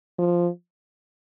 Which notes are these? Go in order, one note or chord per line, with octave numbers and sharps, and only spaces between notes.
F3